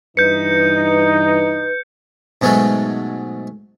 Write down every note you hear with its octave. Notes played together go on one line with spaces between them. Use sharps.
G2 E3 D#4 B4 G6 C#7
G#2 B2 F#3 G#3 A3